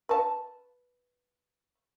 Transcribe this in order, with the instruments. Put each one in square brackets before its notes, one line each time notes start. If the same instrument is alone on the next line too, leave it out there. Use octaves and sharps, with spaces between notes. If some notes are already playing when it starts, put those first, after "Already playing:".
[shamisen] B4 A5